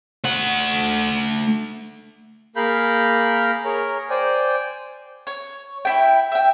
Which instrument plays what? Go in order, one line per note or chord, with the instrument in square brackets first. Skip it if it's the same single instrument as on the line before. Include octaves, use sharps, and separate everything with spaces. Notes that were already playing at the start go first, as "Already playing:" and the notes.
[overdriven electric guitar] A3 F#5
[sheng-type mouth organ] A#3 G#4 A#4 F5 B5 G6
G#4 A#4 C#5
C5 D5 G5 G#5
[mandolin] C#5
E4 E5 G5
E5 G5